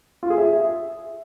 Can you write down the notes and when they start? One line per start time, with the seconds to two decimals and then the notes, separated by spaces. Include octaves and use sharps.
0.23 F4
0.30 G#4
0.38 E5